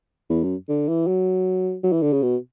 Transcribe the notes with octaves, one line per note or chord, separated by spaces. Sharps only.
E2
F#2
D3
E3
F#3
F#3
E3
D3
C#3
B2